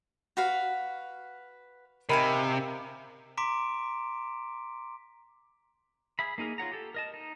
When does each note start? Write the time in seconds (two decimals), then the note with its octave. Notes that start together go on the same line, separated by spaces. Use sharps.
0.37 F#4 B4 F5
2.09 C3 D#4 A#4 F5 G#5 B5
3.37 A#5 C6 D6 B6 D7
6.19 G#4 E5 B5
6.38 A#3 D#4 G#4 A#4
6.58 F4 C#5 F#5 A#5
6.72 G4 A4
6.94 A#4 D#5 A5
7.14 D#4